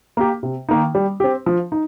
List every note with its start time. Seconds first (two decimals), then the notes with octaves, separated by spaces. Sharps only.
0.17 A#3 G4
0.43 C3
0.69 D#3 A#3 D#4
0.95 G3
1.20 C4 G4
1.46 F3
1.72 D#4